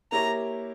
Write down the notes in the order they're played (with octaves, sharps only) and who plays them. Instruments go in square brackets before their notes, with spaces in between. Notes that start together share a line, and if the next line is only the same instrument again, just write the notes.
[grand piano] A#3 E4 G4 C#5 [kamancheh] A#5